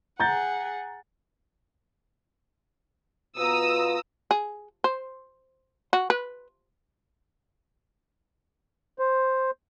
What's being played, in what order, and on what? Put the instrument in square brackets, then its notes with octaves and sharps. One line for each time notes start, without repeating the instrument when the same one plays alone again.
[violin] G#4 F#5 [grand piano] A#5 G6 A6
[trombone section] B2 B3 F4 [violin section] A#5 D#6 E6
[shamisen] G#4
C5
F#4
B4
[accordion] C5